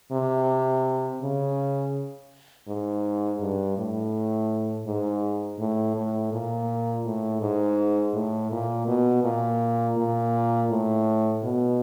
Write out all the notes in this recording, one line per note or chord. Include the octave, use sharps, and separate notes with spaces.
C3
C#3
G#2
G2
A2
G#2
A2
A2
A#2
A2
G#2
A2
A#2
B2
A#2
A#2
A2
B2